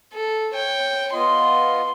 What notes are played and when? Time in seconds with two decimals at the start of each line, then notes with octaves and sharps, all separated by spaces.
0.13 A4
0.54 C#5 G5
1.13 B3 F4 D#5 C6